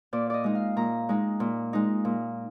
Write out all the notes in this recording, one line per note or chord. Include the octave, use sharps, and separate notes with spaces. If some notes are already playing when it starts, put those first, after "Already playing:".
A#2 D5
D5 D#5
G#3 D#4
F5
A#2 A#5
G#3 D#4
A#2
G#3 D#4
A#2